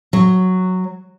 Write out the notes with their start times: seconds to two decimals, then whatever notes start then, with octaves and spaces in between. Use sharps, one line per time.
0.13 F#3